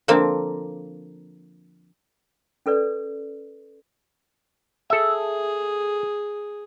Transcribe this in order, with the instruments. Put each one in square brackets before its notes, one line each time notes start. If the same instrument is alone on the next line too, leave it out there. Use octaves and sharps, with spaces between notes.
[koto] D3 F3 A#3 C4
[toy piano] C#4 A4 B4 D5
[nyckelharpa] G#4 [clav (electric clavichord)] A4 E5